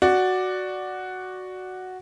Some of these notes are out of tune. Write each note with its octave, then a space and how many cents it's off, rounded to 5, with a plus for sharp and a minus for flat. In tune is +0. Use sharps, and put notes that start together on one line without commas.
F#4 +0 D5 +0